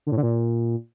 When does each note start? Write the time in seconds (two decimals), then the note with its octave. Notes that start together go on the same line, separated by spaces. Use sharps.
0.07 D3
0.12 A2
0.17 D3
0.23 A#2